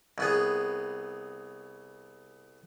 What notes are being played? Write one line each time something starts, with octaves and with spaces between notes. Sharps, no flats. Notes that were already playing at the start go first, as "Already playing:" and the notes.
C2 B3 G#4